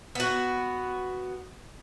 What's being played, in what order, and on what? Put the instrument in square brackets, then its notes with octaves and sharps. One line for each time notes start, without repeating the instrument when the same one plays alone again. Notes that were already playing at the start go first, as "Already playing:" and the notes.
[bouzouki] B3 F#4